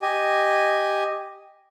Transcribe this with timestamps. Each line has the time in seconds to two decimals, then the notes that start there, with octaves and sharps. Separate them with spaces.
0.02 G4 D#5 G#5